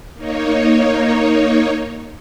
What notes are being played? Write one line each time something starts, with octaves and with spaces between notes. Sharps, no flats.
A#3 D#4 C#5